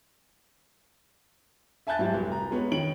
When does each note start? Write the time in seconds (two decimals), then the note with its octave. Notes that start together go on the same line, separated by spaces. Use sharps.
1.87 E5 G#5 A5 F#6 G6 A6
1.99 G#2 F#3 G3 E4
2.13 F1 C2
2.32 A#5
2.51 G#3 B3 C#5
2.72 D#3 C#5 D7 F#7